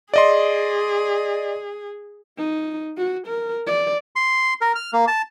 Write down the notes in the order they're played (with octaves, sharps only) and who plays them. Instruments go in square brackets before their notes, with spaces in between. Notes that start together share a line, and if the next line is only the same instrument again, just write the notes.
[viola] G#4 [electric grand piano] D5 D#5 C6
[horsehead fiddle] D#4
F#4
A#4
D5
[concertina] C6
A#4
F6
A#3
A5